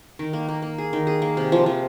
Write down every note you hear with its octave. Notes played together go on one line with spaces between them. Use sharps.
D#3
A#3
A#3
A#3
G#4
D#3
G#4
A#3
C3
F3
F3